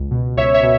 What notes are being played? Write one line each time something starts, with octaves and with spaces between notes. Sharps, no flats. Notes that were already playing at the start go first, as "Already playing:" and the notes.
Already playing: C#2
B2
C#2 C#5 E5
C#5 E5
B2